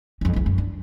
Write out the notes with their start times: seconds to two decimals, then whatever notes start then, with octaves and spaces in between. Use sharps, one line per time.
0.21 F2 C#4
0.33 F1 C#2
0.46 F#2
0.58 D4